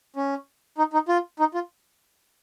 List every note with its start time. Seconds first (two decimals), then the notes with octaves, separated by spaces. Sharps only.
0.16 C#4
0.78 D#4
0.93 D#4
1.08 F4
1.39 D#4
1.54 F4